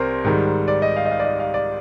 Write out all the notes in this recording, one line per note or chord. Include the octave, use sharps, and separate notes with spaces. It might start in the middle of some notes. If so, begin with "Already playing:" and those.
Already playing: C2 C3 G3 A#4 C5
G#2 D#3 G3
D5
D#5
F5
D#5
F5
D5
D#5
F5
D5